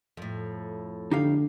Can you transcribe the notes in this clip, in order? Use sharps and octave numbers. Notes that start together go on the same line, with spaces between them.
F2 A2
D3 D#4 G4 F5